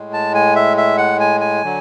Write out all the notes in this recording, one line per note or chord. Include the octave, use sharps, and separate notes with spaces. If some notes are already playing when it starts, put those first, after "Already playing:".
Already playing: A2 G#3
A5
G#5
E5
E5
F#5
G#5
G#5
D3 F#3